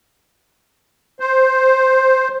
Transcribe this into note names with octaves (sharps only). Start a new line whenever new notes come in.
C5